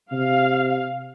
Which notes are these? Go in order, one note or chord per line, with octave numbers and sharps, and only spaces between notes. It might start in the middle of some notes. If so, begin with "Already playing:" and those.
C3 F5